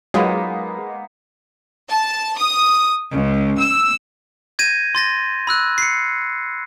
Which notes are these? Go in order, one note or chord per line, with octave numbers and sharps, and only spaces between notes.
F#3 G#3 A#3 B3 D#4 F4
A5
D#6
C#2
E6
G6 G#6 A#6 D#7
C6 A6 A#6
B5 E6 F#6
C7 C#7